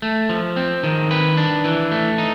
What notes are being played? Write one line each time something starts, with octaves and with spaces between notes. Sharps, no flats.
A3
F3
C4
D#3
B4
D4
E3
A3
D#4